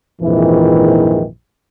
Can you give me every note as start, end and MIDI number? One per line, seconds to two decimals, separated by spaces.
0.21 1.25 34
0.21 1.25 41
0.21 1.25 44
0.21 1.25 51
0.21 1.25 52